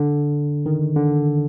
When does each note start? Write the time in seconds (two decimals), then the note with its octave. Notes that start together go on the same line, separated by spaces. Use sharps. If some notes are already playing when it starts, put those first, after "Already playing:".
Already playing: D3
0.66 D#3
0.96 D3